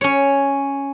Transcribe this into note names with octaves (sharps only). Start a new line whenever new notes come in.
C#4 C#5